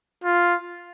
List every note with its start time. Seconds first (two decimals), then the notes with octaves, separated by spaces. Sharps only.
0.24 F4